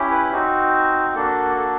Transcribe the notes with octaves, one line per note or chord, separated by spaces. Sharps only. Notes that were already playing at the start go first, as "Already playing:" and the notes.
Already playing: C#4 E4 G4
B4
C4 D#4 F#4
A#3 D4 F#4 A4
A4